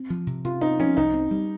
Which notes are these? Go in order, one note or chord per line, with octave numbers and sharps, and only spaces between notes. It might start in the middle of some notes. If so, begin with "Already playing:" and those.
Already playing: C4
F3
C3
C3 F4
C4 D#4
F3 C#4
C2 D#4
C4
G3